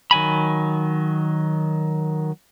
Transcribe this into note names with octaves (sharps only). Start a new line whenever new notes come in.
D#3 F#3 G#5 B5